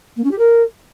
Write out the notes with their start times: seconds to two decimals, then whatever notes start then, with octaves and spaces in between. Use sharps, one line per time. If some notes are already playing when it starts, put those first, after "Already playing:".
0.16 A#3
0.23 C#4
0.31 G4
0.38 A#4